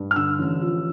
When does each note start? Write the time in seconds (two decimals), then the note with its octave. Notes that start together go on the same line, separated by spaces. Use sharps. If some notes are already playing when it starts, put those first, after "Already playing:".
Already playing: G2
0.11 F6
0.16 D3 E6
0.39 A1
0.62 F3